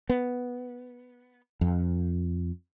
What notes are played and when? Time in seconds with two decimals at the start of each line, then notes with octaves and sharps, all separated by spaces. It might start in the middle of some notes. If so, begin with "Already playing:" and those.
0.09 B3
1.61 F2